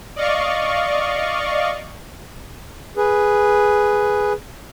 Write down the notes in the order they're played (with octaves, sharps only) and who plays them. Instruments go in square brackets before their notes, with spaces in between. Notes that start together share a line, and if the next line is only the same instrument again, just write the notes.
[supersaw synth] D5 D#5 F5 C#6
[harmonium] G#4 B4